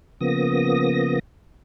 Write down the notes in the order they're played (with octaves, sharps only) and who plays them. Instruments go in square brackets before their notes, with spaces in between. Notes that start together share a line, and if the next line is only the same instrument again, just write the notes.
[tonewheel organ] C#3 F3 A#3 B3 D#6 A#6